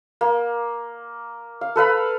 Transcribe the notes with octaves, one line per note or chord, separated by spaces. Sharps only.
A#3
F5
A4 B4 F5 B5